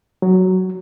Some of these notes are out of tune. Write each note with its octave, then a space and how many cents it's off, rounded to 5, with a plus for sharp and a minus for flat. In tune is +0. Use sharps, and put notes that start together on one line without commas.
F#3 +5